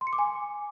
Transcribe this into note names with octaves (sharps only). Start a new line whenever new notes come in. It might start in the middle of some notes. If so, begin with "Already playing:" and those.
C6
C#7
D6
G#5